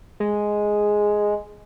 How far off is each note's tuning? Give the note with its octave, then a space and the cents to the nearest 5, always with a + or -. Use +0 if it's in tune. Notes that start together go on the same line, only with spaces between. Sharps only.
G#3 +0